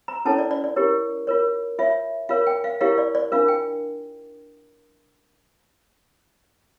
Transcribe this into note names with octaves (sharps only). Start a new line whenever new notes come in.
A#5
C#4 E4 A4 C#5 A5
D5
D5
D5
E4 G4 A#4 C#5
F4 A#4 C#5
F4 C#5 E5
F4 A#4 C#5 F5
G5
F5
E4 G4 A#4 C#5 F5
D5
D5
D4 F4 A#4 F5
G5